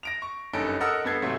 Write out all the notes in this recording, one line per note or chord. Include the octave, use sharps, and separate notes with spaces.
A#6 D7 F7
C#6
F#1 G2 C#4 D#4 A4 D7
A4 A#4 D#5 F#5 E6 F6
G2 B3 A4 G#6 C7
G#2 C3 F#3 A3